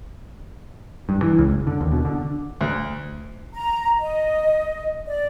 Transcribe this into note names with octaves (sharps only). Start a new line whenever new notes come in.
G2
E3
C#2
F#1
D3
D#2
B2
D3
D2
A#5
D#5
D5